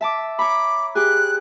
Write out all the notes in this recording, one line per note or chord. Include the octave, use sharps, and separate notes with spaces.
E5 A5 D6
C#5 A#5 B5 D6
G4 G#4 F#6